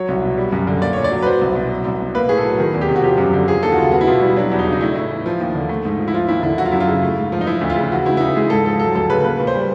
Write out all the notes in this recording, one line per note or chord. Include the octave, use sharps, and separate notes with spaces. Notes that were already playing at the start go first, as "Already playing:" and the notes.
Already playing: F#3 C#5
C2
B2
G3
F#2
D3
A#3 D5
A#2 C#5
D5
F#3
B4
F#3 C5
C2
B2
F#3
C2
B2
A#3 B4
A2 G#4
A4
F#3
D#3 G#4
E2
G4
C3
F#4
F3 G4
F#2
D3
F3 G#4
D#2 A4
F#4
C#3 F4
B3 F#4
E4
B2 F4
G3 E4
F#3 D4
E2
D#4
C#3
D#4
A3 E4
A2
E3
F3
D#2
D3
A3
G#2
F3
E4
F3 F4
D#2 E4
D3 E4
F#3 F#4
F4
F#2 E4
F4
C#3
A3
G#2
F3
D#4
F3 E4
D2
F4
C#3
E3 F#4
C#2 E4
E4
C#3 D#4
G#3 G#4
G#2 A4
F3 A4
F#3 A4
D2 A4
C#3 B4
A#3 B4
A#2
C5
G3